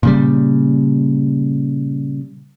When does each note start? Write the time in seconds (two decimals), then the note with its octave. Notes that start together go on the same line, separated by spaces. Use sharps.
0.03 A#2 C#3 G3